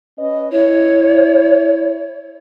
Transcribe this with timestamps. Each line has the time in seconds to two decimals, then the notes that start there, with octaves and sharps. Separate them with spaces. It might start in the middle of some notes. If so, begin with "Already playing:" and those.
0.18 C#4 B4 D#5
0.52 E4 C#5